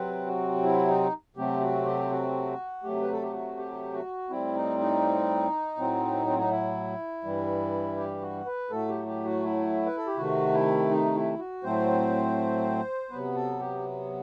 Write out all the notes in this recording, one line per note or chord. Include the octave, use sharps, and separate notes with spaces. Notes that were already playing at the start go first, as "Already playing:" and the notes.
Already playing: C3 F#3 C4 B4
F#4
E4
D#4
C3 F#3 A3 C4 G4
F#4
G4
F#4
C3 F#3 A3 G4
B4
A4
G4
F#4
G4
F#4
A2 G3 C4 E4
D#4
D#4
A2 F#3 C4
C4
D#4
E4
G2 E3 G3
G4
F#4
B4
A2 F#3 A3 A4
G4
G4
F#4
E4
B4
A4
G4
C3 D#3 A3 F#4
E4
D#4
E4
F#4
A2 F#3 A3 C4 C5
C3 F#3 B3 B4
A4
G4